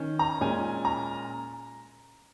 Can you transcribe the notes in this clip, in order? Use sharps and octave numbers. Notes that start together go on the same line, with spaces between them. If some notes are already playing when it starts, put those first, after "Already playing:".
Already playing: D#3 C#4
A#5
A#2 G#3 C#4 G#5
A#5